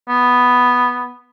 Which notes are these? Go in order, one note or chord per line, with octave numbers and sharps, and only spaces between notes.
B3